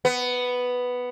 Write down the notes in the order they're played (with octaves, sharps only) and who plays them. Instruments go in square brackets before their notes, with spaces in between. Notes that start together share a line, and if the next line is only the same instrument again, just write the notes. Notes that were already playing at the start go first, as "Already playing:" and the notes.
[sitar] B3